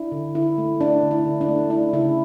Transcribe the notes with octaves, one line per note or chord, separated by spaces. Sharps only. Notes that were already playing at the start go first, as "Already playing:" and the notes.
Already playing: D4 E4
D3
D3 E4
A3
D4
D3
E4
D3
D4
A3
D4 E4
C#3 E4